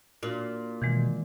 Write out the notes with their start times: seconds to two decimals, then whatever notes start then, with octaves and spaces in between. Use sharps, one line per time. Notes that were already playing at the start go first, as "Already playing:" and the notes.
0.23 A#2 D4 F#4
0.82 B2 D#3 E3 G#3